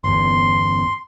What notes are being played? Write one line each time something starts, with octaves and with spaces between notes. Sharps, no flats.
G1 E2 C6